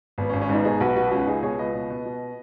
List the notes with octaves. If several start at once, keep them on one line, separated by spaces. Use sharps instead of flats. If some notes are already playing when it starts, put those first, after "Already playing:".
G#1 B3
C#4
G#1
C#4
G#2 B3 D#4
B2 D#4 G#4
B1 F#4 B4
B2 F#4 B4
C#2 C#4 F#4
B4
C#2 D#4 G#4
B2 G#4 C#5
C#2 B4 D#5
B2
B2
B2